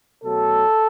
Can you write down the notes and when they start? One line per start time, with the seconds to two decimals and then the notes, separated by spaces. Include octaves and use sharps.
0.23 B2 F#3 A3 A4